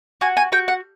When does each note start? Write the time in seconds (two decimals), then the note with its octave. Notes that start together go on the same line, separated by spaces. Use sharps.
0.21 F#4 G#5
0.37 G#5
0.52 F#4 G5
0.68 F#5